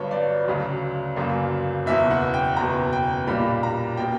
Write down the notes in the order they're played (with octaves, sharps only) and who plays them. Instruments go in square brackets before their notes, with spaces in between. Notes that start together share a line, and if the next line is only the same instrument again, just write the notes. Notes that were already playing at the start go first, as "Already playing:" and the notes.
Already playing: [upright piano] G1 G2 F#3 B3 C#5
D5
D2 C#3 F#3
G1 F#2 C#3 F#3 A#3
F#1 E2 B2 E5
F#5
G5
F#1 E2 B2 A#5
G5
B1 A#2 G3 A#3 B5
A#5
B2 A#3 G5